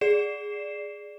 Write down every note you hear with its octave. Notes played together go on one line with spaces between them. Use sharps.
G#4 D5 C7 E7